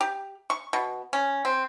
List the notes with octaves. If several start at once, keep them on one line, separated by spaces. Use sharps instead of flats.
G4
C#6
B2
C#4
C4